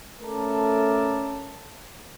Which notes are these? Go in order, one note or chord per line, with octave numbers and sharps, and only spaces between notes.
A3 C#4 A4 A#4 D5 A5